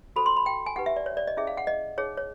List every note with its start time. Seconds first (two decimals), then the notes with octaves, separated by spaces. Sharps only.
0.16 F#4 A4 C5 B5
0.26 C6
0.37 B5
0.46 G5
0.66 G#5
0.76 D#4 G4 B4 F#5
0.86 E5
0.96 D5
1.06 C#5
1.17 D5
1.28 D#5
1.37 C#4 E4 G#4 E5
1.47 F5
1.57 F#5
1.67 D#5
1.97 D#4 G#4 C#5
2.17 C#5